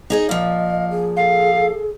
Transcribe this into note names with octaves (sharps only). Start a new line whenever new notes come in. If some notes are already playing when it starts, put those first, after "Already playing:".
D#4 G#4 D#5
A#2 F3 D#5 F5
G#4
A4 F5